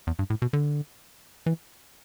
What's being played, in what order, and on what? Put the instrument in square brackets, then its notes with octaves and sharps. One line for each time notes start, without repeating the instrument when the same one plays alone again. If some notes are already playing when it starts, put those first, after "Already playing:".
[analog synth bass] E2
G2
A2
B2
D3
E3